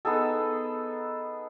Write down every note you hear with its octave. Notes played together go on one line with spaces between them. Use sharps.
B3 D#4 G#4 A4